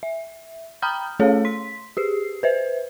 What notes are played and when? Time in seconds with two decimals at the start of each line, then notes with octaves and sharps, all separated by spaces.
0.03 E5
0.82 G5 A#5 B5 D#6 F6 G6
1.20 A3 C#4 G#4 A4 C#5 F5
1.45 C6 B6
1.97 G4 G#4 C7
2.43 B4 C5 E5